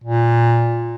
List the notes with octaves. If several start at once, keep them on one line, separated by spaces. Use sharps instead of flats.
A#2